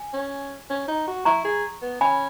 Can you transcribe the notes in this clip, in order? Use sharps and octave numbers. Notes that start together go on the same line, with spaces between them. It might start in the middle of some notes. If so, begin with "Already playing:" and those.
Already playing: G#5
C#4
C#4
D#4
F#4
E4 A#5 C#6
G#4
B3
C#4 G#5 B5